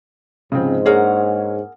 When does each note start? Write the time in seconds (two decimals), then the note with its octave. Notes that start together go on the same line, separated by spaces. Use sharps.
0.52 G#2 C#3 F3 C4
0.86 A#3 D4 G#4 A#4 C#5 F#5